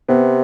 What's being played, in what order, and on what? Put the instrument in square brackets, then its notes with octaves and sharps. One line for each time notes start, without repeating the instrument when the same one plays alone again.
[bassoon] C3 [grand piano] B3